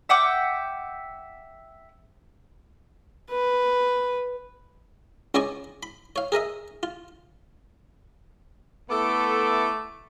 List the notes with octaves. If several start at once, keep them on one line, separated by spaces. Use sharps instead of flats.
E5 F#5 G5 D6
B4
C#2 C#3 G#4 D5 D#5 C#6
B5
C#5 F5
G#4 A#4 D#5 E5
F4
A3 B3 E4 A4 D6